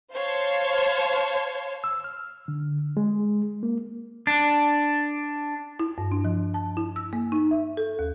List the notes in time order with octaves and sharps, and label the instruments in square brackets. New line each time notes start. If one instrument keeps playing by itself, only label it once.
[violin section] C5 C#5 F5 A5 C6
[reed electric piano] E6
F6
D3
G#3
A#3
[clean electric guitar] D4
[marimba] E4
G2
D4
F3
A5
E4
E6
A#3
D#4
E5
A4
D#2